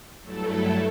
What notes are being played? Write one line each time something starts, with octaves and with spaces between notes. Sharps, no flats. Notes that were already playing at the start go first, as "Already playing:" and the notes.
G2 F#3 A3 E4 A4